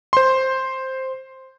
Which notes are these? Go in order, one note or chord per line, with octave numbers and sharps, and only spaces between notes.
C5 C6